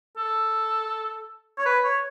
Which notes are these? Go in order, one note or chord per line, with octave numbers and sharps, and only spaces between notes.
A4
C#5
B4
C#5